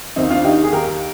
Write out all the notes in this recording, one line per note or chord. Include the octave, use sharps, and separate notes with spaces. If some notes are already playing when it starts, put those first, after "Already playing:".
D#2 C4 D#4
D4 F4
D#3 D#4 G4
G#4
D#2 G4 A#4